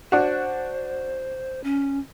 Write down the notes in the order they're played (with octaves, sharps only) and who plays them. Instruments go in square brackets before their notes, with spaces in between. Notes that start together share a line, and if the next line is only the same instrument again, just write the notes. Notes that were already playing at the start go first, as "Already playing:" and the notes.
[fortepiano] D4 F#4 [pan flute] C5
[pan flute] C#4